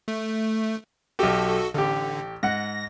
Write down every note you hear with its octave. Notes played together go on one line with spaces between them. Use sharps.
A3
B1 F#4 G4 A4
A1 D3 G4
G#2 F#5 A#6